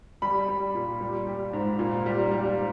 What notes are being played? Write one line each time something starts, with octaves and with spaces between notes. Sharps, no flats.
G3 B5
G3
A#2
G3
G3
G#2
A#2
G3
G3